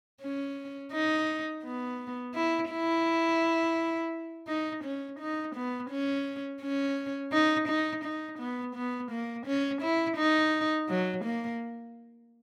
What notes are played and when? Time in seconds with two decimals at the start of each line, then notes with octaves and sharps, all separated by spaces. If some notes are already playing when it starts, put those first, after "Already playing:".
0.22 C#4
0.92 D#4
1.64 B3
2.34 E4
2.71 E4
4.48 D#4
4.84 C#4
5.20 D#4
5.55 B3
5.90 C#4
6.62 C#4
7.32 D#4
7.68 D#4
8.04 D#4
8.39 B3
8.75 B3
9.11 A#3
9.46 C#4
9.82 E4
10.17 D#4
10.89 F#3
11.25 A#3